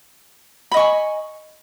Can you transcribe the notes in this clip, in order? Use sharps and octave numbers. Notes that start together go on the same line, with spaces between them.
D#5 G#5 B5 C#6